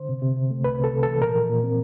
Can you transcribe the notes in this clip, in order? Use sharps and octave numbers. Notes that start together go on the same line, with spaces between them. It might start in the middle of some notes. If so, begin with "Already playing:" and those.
Already playing: D3 C5
C3
C3
C3
A3
C2 B4
C3
A4
C3
E3 A4
A#2 A#4
F3
A#2
C4